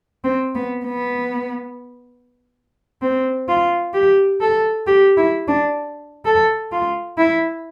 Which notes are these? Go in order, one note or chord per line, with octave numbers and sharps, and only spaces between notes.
C4
B3
B3
C4
F4
G4
A4
G4
E4
D4
A4
F4
E4